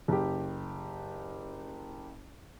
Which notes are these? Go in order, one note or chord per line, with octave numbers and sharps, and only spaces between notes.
F#1 G4